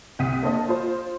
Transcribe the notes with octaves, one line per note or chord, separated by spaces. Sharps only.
C2 F#5 D#6 B6 D#7
A#3 D4 A4 C5 D5 D#5
F4 C5